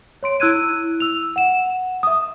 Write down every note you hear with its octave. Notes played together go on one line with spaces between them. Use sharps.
C#5 C6 D7
E4 E6 F#6 G#6 D#7
E6 F7
F#5 E7
E5 D#6